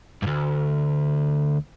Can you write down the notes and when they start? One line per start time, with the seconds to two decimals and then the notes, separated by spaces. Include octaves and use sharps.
0.22 D2 G2